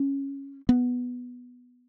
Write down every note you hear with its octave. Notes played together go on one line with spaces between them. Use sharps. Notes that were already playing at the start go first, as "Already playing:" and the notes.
Already playing: C#4
B3